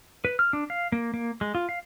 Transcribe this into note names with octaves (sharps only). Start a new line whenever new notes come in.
B4
F6
D4
F5
A#3
A#3
G#3
F4
F5